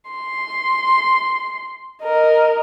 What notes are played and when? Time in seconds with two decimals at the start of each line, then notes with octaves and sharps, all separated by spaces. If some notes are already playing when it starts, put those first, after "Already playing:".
0.11 C6
2.03 A#4 D#5